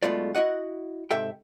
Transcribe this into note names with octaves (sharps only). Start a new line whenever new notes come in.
B1 B2 G#3 A3 F4 D5
E4 F#4 D#5 F#5
G#2 C3 A4 E5 G5